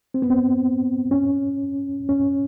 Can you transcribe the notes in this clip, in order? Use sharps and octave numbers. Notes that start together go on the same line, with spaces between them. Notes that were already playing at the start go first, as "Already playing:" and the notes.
C4
B3
C4
C#4
C#4